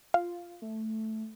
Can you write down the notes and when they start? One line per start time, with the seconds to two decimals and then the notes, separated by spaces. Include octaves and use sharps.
0.14 F4 F5
0.62 A3